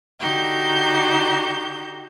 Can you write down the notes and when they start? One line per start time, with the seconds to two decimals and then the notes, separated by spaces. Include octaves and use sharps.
0.20 D3 D#4 F#4 G4 G6